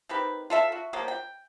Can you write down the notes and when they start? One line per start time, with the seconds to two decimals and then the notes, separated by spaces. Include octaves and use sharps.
0.09 D#3 C4 G4 B4
0.50 F4 A4 E5
0.72 F#4
0.93 F3 F#3 A#3 G4
1.08 G5